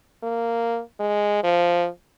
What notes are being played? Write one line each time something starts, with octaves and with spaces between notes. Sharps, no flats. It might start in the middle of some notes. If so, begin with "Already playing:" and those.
A#3
G#3
F3